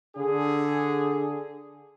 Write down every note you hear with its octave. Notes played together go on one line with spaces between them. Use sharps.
D3 D4 G#4